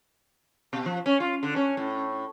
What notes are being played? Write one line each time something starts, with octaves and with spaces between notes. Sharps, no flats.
B2
F3
C#4
F4
D3
C#4
A2